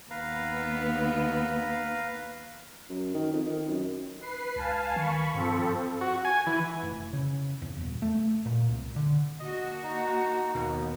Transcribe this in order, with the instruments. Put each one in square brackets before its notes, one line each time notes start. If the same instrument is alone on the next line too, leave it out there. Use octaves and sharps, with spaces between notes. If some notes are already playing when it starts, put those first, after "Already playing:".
[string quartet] D#2 B3 [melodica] B4 F5 A#5
[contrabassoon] F#2
D#3
F2
D#3
F#2
[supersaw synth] B4 C7
[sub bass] C#2 [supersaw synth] F5 G#5 A5
[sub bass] D#3 [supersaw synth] B5 C#6
[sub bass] G2 [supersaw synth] F3 C4 A4
[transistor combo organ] F#4
G#5
E3
[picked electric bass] F1
C#3
E2
D#1
A3
A#2
C2
D3
[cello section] A#3 D4 F#4 [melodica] D#5
[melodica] D#4
[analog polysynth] D#2 B2